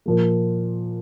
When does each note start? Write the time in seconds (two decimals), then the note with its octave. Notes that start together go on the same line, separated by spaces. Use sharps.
0.06 A#2 F3 A#3